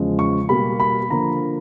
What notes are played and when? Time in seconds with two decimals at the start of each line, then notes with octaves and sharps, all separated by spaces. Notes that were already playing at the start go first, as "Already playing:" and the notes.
Already playing: E2 C#3 F3 G#3
0.19 C#6
0.49 B2 G3 A#3 B5
0.80 B5
1.10 D3 F3 A#3 A#5